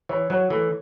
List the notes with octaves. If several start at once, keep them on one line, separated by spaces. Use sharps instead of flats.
E3 C#5
F#3 C#5
E3 A3